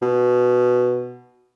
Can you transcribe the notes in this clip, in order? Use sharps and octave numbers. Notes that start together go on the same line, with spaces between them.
B2